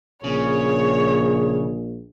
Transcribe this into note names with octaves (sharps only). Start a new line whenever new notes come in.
A#1 C#3 G#4 C#5